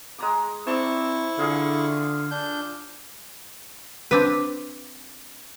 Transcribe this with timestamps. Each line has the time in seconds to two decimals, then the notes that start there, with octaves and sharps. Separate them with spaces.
0.18 G#3 A#5 D6
0.67 C4 E4 D5 A5 C#6
1.38 D3 F4 G#4 F5
2.31 D4 G6
4.11 C4 D4 B4